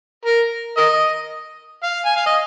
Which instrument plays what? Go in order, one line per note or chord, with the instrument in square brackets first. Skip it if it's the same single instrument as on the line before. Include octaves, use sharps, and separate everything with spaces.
[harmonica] A#4
A#4 D#5
F5
G#5
F5
D#5